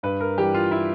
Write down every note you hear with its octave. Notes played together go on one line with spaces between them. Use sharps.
G2 B4
A#4
E3 G3 G4
F4
E4